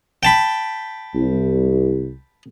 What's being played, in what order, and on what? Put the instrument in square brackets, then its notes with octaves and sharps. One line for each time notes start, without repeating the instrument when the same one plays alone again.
[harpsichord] G5 A5 B5
[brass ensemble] C2